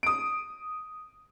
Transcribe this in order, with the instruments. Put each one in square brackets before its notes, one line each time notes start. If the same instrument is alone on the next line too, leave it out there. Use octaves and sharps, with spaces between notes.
[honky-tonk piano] D#6 D7